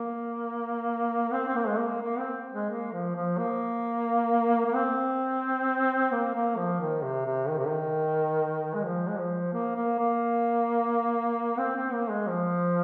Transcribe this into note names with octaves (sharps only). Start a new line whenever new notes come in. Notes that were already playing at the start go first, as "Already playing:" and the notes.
Already playing: A#3
C4
C4
A#3
G#3
A#3
A#3
C4
G#3
A#3
F3
F3
A#3
A#3
C4
A#3
A#3
F3
D#3
C3
C3
D#3
C3
D#3
G#3
F3
G#3
F3
A#3
A#3
A#3
C4
C4
A#3
G#3
F3